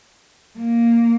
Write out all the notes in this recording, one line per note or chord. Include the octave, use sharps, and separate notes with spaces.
A#3